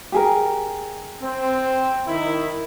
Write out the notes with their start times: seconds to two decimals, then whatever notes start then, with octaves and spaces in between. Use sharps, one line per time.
0.12 G4 G#4 A#4
1.22 C4
2.07 D#3 E4